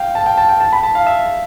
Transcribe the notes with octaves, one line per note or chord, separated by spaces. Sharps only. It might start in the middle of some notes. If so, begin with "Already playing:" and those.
Already playing: F5 G5
A5
G5
A5
G5
A5
B5
A5
F5
E5